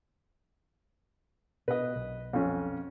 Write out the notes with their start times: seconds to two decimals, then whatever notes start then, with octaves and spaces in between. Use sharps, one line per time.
1.68 B2 B4 D#5
1.96 B1
2.33 F2 C#4